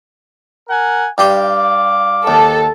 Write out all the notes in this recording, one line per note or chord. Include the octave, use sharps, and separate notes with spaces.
A#4 F#5 G#5
G2 G4 F5 C6 D6
D#2 A4